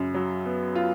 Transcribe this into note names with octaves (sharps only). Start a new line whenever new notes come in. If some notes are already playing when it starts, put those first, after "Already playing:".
Already playing: F#2 C#3
F#3
B3
F4